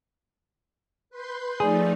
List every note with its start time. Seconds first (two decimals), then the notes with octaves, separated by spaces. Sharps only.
1.10 B4 C6 G6
1.60 F3 A3 D#4 G#4 D5